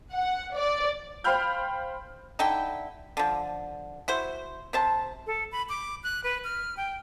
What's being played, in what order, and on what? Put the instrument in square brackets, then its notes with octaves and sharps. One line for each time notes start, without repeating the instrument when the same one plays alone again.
[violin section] F#5
D5
[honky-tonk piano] C5 F5 G5 B5 F6 G6
[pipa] D3 D#4 E4 G5
D3 F3
E4 F#4 C5
C3 C5 A5
[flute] A4
B5
D6
F#6
B4
F6
G5